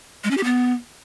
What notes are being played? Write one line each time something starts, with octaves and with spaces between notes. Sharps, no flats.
G#3
C#4
G4
B3